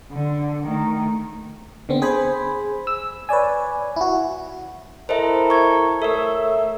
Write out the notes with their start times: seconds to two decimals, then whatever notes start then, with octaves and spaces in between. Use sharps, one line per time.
0.12 D3
0.64 D#3 A3
1.89 D3 B3 C4
2.02 G#4 C5 G#5 B5
2.87 E6
3.29 B4 C#5 D5 G#5
3.96 E4 F#4
5.09 E4 A4 A#4 C5 D#5 E5
5.50 C#6 G#6
6.02 A3 A4 A#4 C#5 E5